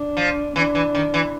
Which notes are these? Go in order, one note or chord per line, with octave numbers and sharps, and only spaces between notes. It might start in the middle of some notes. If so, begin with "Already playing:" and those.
Already playing: D4
F3
E3 D4
E3
D#3
E3